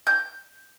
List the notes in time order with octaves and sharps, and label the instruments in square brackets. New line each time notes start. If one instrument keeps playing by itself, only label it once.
[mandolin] G6